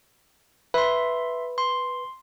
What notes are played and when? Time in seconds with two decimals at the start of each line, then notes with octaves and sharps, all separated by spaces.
0.74 B4 E5 C6
1.58 C6